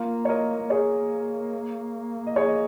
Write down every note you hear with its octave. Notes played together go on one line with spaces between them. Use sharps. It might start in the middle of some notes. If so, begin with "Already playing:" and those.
Already playing: A#3 F4 A#4
C#5
A#4 D#5
A#3 G#4 C#5
D#5
G#4 C#5
D#5